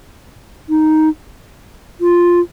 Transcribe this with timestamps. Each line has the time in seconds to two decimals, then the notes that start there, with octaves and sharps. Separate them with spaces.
0.69 D#4
2.01 F4